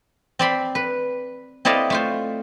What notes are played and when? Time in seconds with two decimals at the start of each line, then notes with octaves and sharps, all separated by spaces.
0.39 C4 D5 B5 C6
0.75 B4
1.65 C4 E4 A4 D5 D#5 F5
1.90 A3 F4 C5